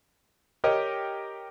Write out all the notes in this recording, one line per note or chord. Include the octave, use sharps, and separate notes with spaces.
G4 A#4 C#5 D#5